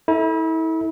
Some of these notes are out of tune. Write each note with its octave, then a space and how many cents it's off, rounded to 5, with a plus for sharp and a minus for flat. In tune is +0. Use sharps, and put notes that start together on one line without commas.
E4 -35 A4 +0